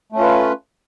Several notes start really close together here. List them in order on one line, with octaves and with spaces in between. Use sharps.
A3 C#4 F4 B4